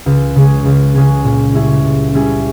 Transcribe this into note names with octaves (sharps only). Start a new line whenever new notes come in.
C#2
C#3 G#3 C#4 G#4
C#2
C#3 G#3 C#4 G#4
A#2
G3 C#4 E4 G#4
A#2
G3 C#4 E4 G#4